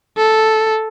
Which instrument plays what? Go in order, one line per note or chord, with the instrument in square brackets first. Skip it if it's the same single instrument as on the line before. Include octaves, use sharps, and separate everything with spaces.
[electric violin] A4